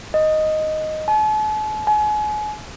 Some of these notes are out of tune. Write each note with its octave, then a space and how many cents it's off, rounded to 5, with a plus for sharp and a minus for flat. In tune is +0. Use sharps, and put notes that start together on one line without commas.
D#5 +0
A5 -45
G#5 +35